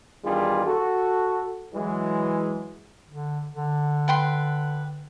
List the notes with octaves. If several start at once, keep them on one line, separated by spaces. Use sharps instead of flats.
E2 D#3 G3 D4 F4 G#4
F#4 A4
E3 F#3 G#3
D3
D3
B4 G5 C6